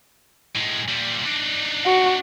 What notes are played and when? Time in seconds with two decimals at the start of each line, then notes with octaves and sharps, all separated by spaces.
0.55 A2 G#3
0.88 A#2 G3
1.25 D4 D#4
1.86 F#4